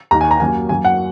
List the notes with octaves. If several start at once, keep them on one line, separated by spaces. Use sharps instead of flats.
D#2 D#3 A#3 A#5
G#5
A#5
F#2 F#3 A#3 G#5
F#2 F#3 A#3 G#5
F#5